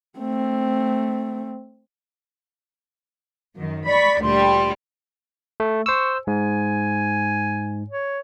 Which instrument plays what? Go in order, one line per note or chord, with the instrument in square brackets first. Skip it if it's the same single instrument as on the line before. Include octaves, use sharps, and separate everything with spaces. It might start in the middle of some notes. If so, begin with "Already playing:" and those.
[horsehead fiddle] A3 C4
[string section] F#2 D#3
[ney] D5 [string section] B5 C#6 B6
[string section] D2 A#2 G3 [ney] C6
[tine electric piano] A3
[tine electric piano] C5 E6 [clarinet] C#6
[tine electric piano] G#2 [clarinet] G#5
[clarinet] C#5